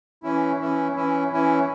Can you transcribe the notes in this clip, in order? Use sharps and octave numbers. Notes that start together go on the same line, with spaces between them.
E3 C#4 E4
E3 C#4 E4
E3 C#4 E4
E3 C#4 E4